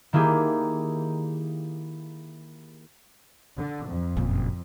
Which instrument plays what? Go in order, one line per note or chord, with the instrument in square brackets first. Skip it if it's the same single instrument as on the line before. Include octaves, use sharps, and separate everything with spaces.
[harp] D#3 A#3 E4 G4 G#4
[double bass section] D3
F2
[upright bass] F#1 A#2